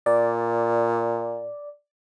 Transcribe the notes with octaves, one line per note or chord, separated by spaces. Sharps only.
A#2 D5